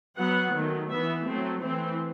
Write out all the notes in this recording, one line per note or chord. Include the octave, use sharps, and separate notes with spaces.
F#3 B3 F#5
D#3 F#3 A3
E3 B3 E5
F#3 A3 C4
E3 A3 C4